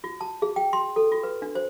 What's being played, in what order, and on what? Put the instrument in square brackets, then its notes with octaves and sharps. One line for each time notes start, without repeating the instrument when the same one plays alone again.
[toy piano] F4
A5
G#4
G5
C6
A4
F4
B4
D4
C5